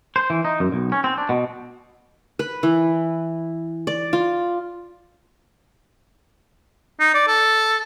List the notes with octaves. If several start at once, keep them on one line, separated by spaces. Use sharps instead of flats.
C5
E3
D#4
F#2
B1
C#4
C4
D4
B2
B4
E3
D5
F4
D#4
D5
A4